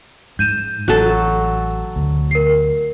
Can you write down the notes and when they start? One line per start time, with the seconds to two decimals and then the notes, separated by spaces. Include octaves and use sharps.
0.39 G#2 G6 D#7 E7
0.88 A1 F#3 A4 F#6
1.96 D2
2.31 A#4 C7